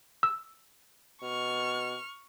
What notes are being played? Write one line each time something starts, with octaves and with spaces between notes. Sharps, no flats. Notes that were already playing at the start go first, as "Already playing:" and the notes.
E6
B2 C#6 F6